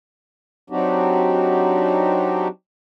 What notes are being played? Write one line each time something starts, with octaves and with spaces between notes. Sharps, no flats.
F#3 C4 D4 D#4 F#4 G4